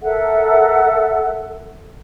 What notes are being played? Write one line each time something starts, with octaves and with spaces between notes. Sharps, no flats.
A4 A#4 E5 F#5